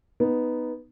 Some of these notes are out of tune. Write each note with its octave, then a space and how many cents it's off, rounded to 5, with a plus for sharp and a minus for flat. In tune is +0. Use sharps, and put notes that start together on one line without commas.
B3 +0 D#4 +0